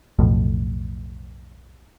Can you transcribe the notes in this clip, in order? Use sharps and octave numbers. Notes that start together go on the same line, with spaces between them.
B1 F2 A2